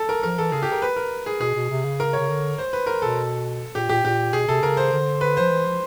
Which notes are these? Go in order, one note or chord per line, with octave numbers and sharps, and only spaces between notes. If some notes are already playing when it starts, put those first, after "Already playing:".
Already playing: A4
A#4
F3 A#4
E3 A4
C#3 G#4
G4
A#4
B4
A#4
G#4
B2 G#4
B2
C3
C#3
A#4
C#5
C#3
D3
C5
B4
A#4
B2 A4
A#2 G4
A#2 G4
A#2 G4
B2 G#4
C3 A4
C#3 A#4
C5
D3
B4
F3 C5
E3
F3